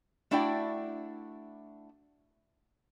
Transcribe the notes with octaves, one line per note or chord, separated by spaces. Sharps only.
A3 D4 E4 F#4 D5 G5